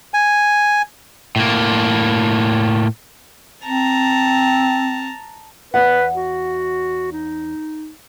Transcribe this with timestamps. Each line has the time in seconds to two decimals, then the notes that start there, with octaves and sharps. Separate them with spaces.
0.14 G#5
1.36 A2 A#3
3.65 C4 A5 A#5
5.74 E2 B4 F#5
6.15 F#4
7.12 D#4